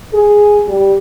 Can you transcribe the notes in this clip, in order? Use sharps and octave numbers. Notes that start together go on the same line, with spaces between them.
G#4
G3